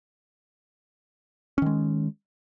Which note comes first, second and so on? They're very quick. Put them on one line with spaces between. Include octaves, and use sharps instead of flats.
C#4 D#3 G#3